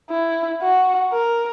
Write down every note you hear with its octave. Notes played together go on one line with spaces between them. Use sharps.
E4
F#4
A#4